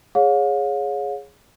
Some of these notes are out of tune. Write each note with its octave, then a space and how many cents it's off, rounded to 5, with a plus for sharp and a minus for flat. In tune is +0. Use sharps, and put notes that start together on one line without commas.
G#4 +0 C#5 +0 F5 +40